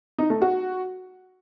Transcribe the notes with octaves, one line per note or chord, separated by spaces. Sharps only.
D#4
A3
F#4